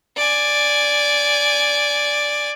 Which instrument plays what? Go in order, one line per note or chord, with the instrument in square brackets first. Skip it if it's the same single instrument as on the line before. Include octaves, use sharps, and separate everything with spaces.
[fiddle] D5 G#5